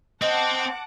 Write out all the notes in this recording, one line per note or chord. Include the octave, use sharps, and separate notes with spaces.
C4 C5 D#5 F#5 A5 D6